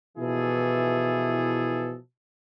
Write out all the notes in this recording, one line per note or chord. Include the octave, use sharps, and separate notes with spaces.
B2 E3 F3 E4 G#4 A4